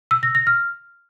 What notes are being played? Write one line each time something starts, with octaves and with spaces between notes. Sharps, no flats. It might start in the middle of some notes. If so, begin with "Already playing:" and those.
E6
A#6
A#6
F6